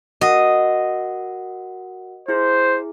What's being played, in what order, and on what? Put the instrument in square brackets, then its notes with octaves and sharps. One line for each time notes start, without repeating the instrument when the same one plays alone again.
[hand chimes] F#4 A#4 F#5 [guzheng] D#5
[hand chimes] E4 G#4 [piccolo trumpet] C5